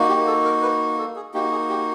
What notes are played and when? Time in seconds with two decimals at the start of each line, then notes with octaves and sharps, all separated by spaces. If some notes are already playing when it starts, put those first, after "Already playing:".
Already playing: A#3 D#4 F#4
0.09 G4
0.27 A4
0.45 A#4
0.62 B4
0.99 A4
1.16 G#4
1.34 A#3 D#4 F#4 G4
1.52 G#4
1.70 G4